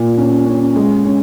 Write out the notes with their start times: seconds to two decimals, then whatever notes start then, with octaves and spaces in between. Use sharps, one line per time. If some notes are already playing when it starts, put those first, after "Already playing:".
Already playing: A#2 A#3
0.17 C#4
0.46 C#4
0.75 G#3
1.05 C#4